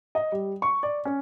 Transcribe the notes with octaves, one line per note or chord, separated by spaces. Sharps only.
D#5
G3
C#6
D5
C#4